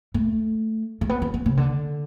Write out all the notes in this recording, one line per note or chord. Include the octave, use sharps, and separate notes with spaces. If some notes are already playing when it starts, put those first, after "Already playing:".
A3
A3
B3
C#4
B3
C#3
D3